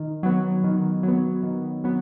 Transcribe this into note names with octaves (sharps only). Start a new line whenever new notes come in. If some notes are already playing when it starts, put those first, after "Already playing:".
Already playing: D#3
F#3 B3
D#3
F#3 B3
D#3
F#3 B3